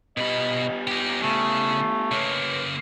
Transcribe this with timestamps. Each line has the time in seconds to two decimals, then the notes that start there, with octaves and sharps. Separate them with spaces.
0.17 B2 G3 B3 D#5 B5
0.87 D#4 G4
1.23 C#3 A3
2.11 C#3 A#3 B4 C#5